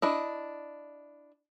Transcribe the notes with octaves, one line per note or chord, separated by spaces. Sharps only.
D4 E4 D#5